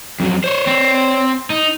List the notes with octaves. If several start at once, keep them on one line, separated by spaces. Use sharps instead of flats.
F2 F#3
C5 C#5
C4
D#4